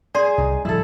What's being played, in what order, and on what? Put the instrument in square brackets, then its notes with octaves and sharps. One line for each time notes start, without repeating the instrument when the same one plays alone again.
[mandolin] G#4 [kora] C5 [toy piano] D5 C6
[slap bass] C2 [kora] D#4
[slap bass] D1 F3 G3 [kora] E4 A4